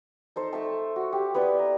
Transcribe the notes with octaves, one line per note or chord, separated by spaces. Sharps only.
D#4 A4 C5
A3 E5 A5
F#4
G4
B3 E4 B4 D5
A#5